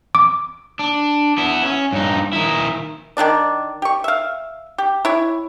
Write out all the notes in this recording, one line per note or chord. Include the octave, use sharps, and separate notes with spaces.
D6
D4
B3 E4
C#4
G2 D#4
D#3 E4
D#3 G#3 D4 D5
G4 C#6
E5 F5
G4
E4 C#5